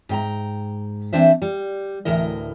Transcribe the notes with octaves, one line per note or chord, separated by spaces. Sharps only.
G#2 G5 A#5
E3 C4 D4 C5 E5
G3
D2 A2 E3 A#4 D#5